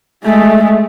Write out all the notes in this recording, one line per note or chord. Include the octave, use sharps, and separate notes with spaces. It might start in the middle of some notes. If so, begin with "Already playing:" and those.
G#3 A3